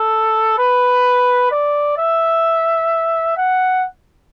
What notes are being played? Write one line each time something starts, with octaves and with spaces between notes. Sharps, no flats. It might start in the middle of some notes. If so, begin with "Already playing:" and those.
Already playing: A4
B4
D5
E5
F#5